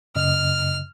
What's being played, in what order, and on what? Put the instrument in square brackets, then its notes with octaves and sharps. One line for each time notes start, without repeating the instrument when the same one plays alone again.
[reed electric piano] F#2 C#3 D#5 [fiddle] F6